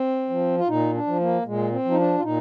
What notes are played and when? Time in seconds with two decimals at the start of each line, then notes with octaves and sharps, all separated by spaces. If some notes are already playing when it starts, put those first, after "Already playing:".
Already playing: C4
0.30 F3
0.57 F4
0.68 A#2 D#4
0.94 D4
1.07 F3
1.20 A#3
1.46 A#2 G#3
1.72 C4
1.85 F3
1.91 D#4
1.98 D4
2.17 F4
2.23 A#2 D#4